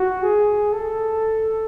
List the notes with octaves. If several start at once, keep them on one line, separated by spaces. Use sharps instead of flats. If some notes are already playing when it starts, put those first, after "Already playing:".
Already playing: F#4
G#4
A4